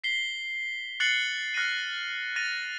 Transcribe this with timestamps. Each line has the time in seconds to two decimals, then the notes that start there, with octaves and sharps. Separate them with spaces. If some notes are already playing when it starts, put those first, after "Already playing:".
0.04 B6 C7 G7
1.00 F#6 A6 C7 C#7 F#7 G7
1.54 F6 F#6 A#6 C#7 D#7
2.36 A6 A#6 D#7 F7